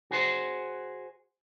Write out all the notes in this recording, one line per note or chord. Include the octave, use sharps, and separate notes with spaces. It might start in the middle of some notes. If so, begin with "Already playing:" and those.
F#4 G#4 C5